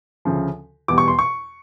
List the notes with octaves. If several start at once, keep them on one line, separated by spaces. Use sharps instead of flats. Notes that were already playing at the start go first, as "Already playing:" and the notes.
D2 C#3 F3
E2 B2 G3 D6
C#6
C6
C#6